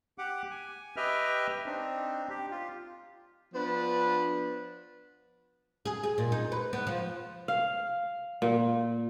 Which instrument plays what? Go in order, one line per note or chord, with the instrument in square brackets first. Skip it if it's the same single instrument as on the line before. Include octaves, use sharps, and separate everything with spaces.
[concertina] G4 F#5 D6
G#5
G4 B4 D#5 E5 G5 F6
C4 D4 D#4
G4
F4
[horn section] F3 B3 D4 B4
[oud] G#4
G#4
A#2
D#4
B4
B3
F3
[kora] F5
A#2